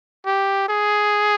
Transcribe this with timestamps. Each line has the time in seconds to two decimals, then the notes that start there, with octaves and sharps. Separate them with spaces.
0.26 G4
0.69 G#4